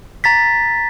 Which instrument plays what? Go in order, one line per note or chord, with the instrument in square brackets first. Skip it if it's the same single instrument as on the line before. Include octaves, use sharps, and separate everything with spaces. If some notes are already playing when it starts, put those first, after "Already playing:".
[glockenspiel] A#5 A6 B6